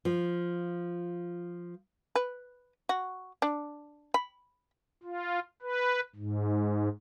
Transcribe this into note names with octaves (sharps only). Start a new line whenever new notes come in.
F3 F4
B4
F#4
D4
B5
F4
B4
G#2